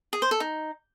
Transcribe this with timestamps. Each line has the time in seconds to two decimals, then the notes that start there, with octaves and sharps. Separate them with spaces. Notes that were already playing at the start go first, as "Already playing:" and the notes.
0.13 G#4
0.22 C5
0.31 A4
0.40 D#4